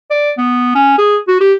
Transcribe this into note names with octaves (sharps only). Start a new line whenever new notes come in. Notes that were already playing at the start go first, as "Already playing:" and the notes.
D5
B3
C#4
G#4
F#4
G4